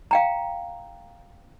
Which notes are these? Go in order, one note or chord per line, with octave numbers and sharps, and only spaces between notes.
F5 G5 A#5